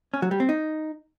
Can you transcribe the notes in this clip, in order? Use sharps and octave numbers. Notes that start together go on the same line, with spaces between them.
C#4
F#3
G3
C4
D#4